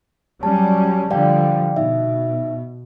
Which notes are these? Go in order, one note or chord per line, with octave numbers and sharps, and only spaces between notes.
F#3 G3 C#4 A5
D3 F3 G3 D5 F5 G5
B2 D#4 E5